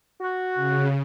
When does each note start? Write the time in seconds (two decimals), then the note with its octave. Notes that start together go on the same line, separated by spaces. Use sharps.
0.21 F#4
0.55 C#3